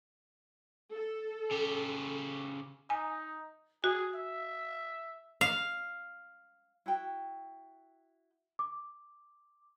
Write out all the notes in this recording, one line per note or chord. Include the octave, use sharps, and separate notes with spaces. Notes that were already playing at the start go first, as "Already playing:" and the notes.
A4
C#3 G4
D#4 G#5
F#4 G#4
E5
F5
E4 F#4 G5
D6